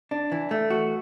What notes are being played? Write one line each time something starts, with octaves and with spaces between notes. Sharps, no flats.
D4
E3
A3
F#4